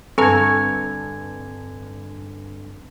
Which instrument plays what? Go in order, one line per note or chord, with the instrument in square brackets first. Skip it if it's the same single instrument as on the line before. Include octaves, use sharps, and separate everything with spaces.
[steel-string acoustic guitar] G2 D3 [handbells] C4 B4 [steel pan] A4 A#5 [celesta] G#5 G#6